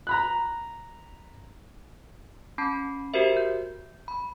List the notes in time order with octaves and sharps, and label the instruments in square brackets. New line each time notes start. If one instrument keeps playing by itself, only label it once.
[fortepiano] A#5 B5 F#6
[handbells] C#4 A5 B5 C7
F#4 G4 A#4 C5 E5
G6
B5